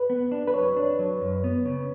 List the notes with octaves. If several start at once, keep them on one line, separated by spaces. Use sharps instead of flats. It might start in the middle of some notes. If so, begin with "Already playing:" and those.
Already playing: B4
B3
D4
B4
F#3 C#5
D4
F#3
F#2
B3
C#3